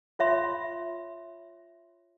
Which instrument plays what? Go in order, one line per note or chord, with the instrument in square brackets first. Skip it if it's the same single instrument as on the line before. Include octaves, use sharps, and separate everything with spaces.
[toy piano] F4 C#5 E5 B5 C6